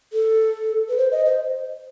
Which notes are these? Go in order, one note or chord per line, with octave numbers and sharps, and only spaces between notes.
A4
B4
C5
D#5
C5